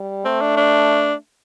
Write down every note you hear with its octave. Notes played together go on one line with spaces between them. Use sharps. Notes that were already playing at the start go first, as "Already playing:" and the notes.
Already playing: G3
A3 C4
D4
D4